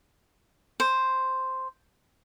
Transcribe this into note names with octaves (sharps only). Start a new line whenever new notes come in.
C5